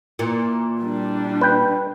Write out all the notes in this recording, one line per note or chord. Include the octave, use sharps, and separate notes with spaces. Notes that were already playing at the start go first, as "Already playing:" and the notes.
A#2 E3
G3 D4
B4 G5